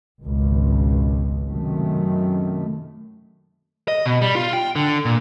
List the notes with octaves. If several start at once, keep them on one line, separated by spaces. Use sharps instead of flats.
G#1 C#2 B2
F#2 C3 D#3 A3
D#5
B2
G3
F4
G5
D3
A#2